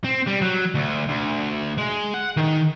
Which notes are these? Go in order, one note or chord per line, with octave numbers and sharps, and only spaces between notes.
C4
G3
F#3
D2
D2
G#3
F#5
D#3